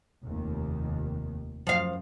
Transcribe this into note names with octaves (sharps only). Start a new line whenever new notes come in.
F1 D#2 D#3
F#2 F3 F5